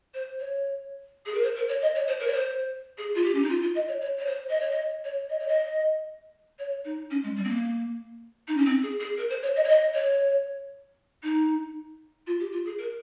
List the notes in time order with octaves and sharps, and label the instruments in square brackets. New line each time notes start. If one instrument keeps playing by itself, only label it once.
[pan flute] C5
C#5
G#4
A#4
C5
A#4
C#5
D#5
C#5
C5
A#4
C#5
C5
G#4
F4
G4
C#4
D#4
F4
F4
D#5
C#5
C#5
C#5
C5
D#5
C#5
D#5
C#5
D#5
C#5
D#5
C#5
D#4
C#4
G#3
G3
C4
A#3
D#4
C#4
C4
G#4
G#4
A#4
C5
C#5
D#5
C#5
D#5
C#5
D#4
F4
G4
F4
G#4
A#4